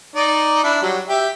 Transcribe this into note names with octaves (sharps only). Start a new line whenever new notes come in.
D#4 D5
D4 E4
F#3 G3
G4 E5